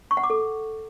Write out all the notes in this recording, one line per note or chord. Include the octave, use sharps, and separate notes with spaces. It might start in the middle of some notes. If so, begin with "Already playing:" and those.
C#6
F#5
D6
A4